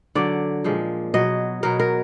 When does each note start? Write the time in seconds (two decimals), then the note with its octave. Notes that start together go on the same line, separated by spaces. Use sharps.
0.15 D3 F#3 D5
0.64 A#2 F3 G#3
1.14 B2 F#3 D#5
1.63 B2 F#3 A#4
1.80 A#4